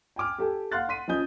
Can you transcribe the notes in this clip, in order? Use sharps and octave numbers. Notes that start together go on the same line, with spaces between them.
G5 G#5 D6 F6
G4 A4 G5 G#5
F5 F#5 C6 F6 F#6 A6
F#5 C6 B6 D#7
F3 C#4 D#5 G#5 D#6 G6